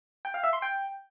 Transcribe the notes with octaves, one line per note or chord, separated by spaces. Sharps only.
G5
F5
E5
C6
G5